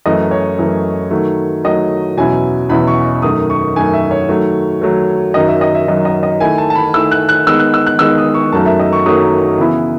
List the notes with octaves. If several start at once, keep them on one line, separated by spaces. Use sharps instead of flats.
F#2 E3 A3 D#5
C#5
F#2 E3 A3
D#3 F#3 A3
D#3 F#3 A3 D#5
E2 B2 F#3 C#4 E4 G#5
E2 B2 F#3 C#4 E4 B5
C#6
F#2 D#3 A3 D#6
C#6
F#2 D#3 A3 G#5
E5
C#5
D#3 F#3 A3
D#3 F#3 A3
F#2 D#3 F#3 D#5
E5
D#5
E5
F#2 D#3 F#3 D#5
D#5
D#5
D#3 A3 E4 G#5
A5
A5
B5
D#3 A3 E4 E6
F#6
F#6
D#3 G#3 B3 D#4 E6
F#6
E6
F#6
D#3 G#3 B3 D#4 E6
D#6
C#6
F#2 D#3 F#3 A3 A5
E5
D#5
C#6
F#2 D#3 F#3 A3 D#6
C#3 E3 B3 E4